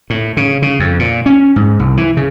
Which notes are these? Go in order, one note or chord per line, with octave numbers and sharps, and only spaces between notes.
A2
C#3
C#3
F2
A#2
C#4
G#2
C2
E3
C#3